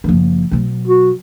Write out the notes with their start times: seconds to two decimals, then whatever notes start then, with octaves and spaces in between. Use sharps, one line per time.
0.04 F#1 F3
0.51 B2 F#3
0.87 F#4